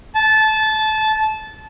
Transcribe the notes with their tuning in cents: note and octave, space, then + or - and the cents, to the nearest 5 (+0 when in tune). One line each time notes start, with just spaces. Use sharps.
A5 -20